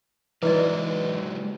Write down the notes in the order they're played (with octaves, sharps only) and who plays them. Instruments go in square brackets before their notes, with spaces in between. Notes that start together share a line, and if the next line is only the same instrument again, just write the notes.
[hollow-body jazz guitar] E3 [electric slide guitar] F#3 G#3 D#5 [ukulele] D#4 E4 D5 [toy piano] B4